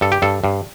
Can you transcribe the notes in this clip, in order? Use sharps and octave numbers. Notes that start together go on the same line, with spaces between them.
G2 A4
G4
G2 A4
G2